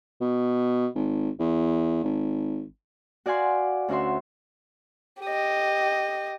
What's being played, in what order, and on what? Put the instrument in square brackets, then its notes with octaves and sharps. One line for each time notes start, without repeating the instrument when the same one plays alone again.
[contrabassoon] B2
G#1
E2
G#1
[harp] F#4 D5 F5 G#5 C6 F#6
D2 C#4 F#4 E5 C6
[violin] G4 D#5